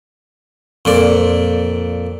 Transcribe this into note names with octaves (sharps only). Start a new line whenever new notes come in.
F2 A#2 D5